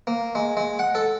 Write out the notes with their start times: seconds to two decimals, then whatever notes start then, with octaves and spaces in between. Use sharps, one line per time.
0.07 A#3
0.35 G#3
0.57 G#3
0.79 F#5
0.95 A4